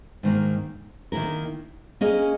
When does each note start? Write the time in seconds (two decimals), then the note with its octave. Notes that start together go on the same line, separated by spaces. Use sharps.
0.23 G#2 D#3 A#3
1.12 D#3 A#3 E4 A#4
2.01 A#3 C#4 G#4 D#5